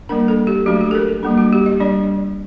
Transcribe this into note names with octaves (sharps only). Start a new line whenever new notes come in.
G3 A#3 D4 A#4
A4
G4
F#3 A3 D4 F#4
G4
A4
A#4
G3 A#3 D4
F#4
G4
D#5
G3 D4 D5